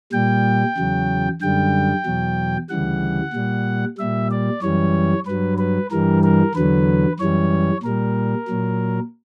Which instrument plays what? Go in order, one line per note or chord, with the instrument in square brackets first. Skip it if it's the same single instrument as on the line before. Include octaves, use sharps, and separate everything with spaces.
[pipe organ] A#2 G3 G5
E2 C#3 F#3
F#2 D3 G3 G5
E2 B2 F#3
D2 C#3 E3 G3 F#5
A#2 G3
A#2 G3 E5
D5
F#2 E3 G3 C#5
G2 F#3 B4
B4
G2 E3 G3 A#4
A#4
E2 D3 F#3 B4
F#2 E3 G3 C#5
A#2 G3 A#4
A#2 F#3